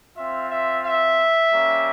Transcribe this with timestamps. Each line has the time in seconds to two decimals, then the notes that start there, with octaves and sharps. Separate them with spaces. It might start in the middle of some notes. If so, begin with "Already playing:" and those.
0.16 C4 F4 E5
0.49 E5
0.84 E5
1.52 G3 A#3 C#4